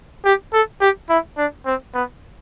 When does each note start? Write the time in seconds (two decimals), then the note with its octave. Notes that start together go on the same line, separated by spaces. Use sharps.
0.25 G4
0.53 A4
0.81 G4
1.09 E4
1.38 D4
1.66 C4
1.94 B3